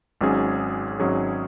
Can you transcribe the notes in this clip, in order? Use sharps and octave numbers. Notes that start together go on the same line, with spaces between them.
G#1 G#2 F#3 C#4 G#4
G#1 G#2 F#3 C#4 G#4